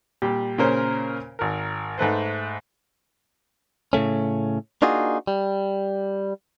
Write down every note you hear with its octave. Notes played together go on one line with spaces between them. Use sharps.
A#2 G3 G4
A#2 C#3 C#4 A#4 C5 C#5
G#1 A#4
G#2 A3 B4 C5
A2 C#3 A3 C#4
A#3 D4 D#4 F4 F#4 G#4
G3